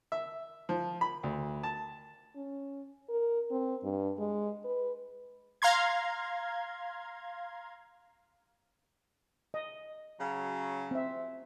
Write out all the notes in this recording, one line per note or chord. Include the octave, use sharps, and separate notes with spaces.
E5
F3
B5
D2
A5
C#4
A#4
C4
G2
G#3
B4
F5 A#5 C6 G#6
D#5
C#3 F#3
C4 E5